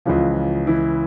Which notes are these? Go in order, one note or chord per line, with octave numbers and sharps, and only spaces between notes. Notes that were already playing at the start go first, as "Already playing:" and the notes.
C#2 C#3 E3 F3 F4
E3 E4